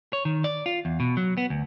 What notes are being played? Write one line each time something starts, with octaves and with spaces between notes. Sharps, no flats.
C#5
D#3
D5
F4
E2
B2
F#3
B3
D2